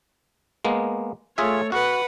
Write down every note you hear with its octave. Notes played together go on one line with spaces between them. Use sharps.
G#3 A#3 B3
A3 F4 G#4 C#5 E5
F#4 B4 F#5